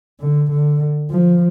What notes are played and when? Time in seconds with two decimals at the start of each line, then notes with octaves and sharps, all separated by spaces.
0.20 D3
0.51 D3
1.10 F3